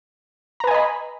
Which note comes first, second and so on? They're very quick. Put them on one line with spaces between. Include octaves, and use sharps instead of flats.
A#5 B4 G#5 D#5 B5